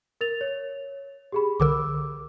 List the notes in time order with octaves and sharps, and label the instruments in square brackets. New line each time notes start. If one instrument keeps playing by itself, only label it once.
[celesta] A#4 A6 F7
C#5
G4 G#4 B5
[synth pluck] C2 D3 A#4 [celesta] D6 E6